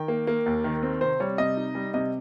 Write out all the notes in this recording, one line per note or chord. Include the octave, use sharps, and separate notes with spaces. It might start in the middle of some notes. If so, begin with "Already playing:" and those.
Already playing: D#3 G5
A#3
A#3
D#2
D#3
C4
C3 C5
G3 C#5
C3 D#5
D#4
G3
C3 D#5